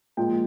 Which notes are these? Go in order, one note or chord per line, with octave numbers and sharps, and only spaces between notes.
A#2 F3 G#3 G5